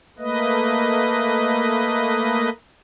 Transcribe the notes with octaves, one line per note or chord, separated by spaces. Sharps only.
A3 A#3 B4 D#5